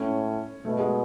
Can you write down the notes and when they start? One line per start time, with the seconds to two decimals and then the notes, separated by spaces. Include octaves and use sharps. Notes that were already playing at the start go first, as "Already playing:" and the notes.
Already playing: A2 C#4
0.65 B2 A3
0.79 G#3